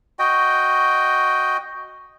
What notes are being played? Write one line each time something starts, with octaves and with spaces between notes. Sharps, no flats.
F#4 D#5 G5